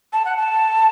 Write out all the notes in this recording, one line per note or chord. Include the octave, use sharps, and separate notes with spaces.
A5
F#5
A5